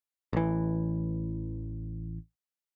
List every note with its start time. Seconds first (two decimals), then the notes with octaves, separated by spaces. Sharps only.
0.33 A1 E3